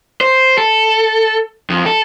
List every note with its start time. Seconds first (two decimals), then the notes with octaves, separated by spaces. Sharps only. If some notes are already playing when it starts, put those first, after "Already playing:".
0.21 C5
0.58 A4
1.70 F2
1.86 A4